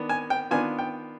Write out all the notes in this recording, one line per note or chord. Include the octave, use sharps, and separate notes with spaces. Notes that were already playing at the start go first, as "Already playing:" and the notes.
Already playing: D#3 B3 D4
G#5
G5
D#3 B3 D4 F4 G#5
G5